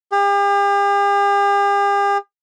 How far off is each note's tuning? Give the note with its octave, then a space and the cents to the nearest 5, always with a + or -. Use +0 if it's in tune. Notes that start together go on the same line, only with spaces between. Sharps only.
G4 +45